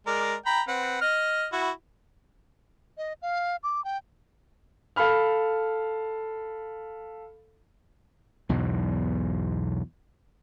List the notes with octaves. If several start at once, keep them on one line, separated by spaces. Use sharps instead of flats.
G#3 A#4 D5
G5 A#5 B5
C4 B4 F#5
D#5 F6
E4 F#4
D#5
F5
D6
G5
A4 F5 B5 F6
B1 E2 G#2 B2